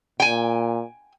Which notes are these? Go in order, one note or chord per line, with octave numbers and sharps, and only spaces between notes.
A#2 G5 G#5